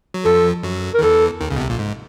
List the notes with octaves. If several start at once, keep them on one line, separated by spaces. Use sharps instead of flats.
F#3
F2 F3 A4
F#2 F#3
A#4
D#3
E2 E3 A4
D#2 D#3
C#2 C#3
B2
C2 C3
A#1 A#2
G#2